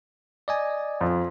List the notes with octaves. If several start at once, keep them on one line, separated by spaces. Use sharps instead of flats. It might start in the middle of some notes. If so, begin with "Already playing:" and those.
D5 D#5 G#5
F2